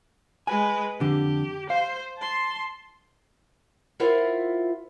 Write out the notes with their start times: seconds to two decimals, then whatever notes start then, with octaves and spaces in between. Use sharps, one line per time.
0.47 G#3 B4 G#5
1.00 F2 D3 G4
1.70 C5 F5
2.18 A5 C6
4.00 E4 F4 A#4 C5 E5 F#5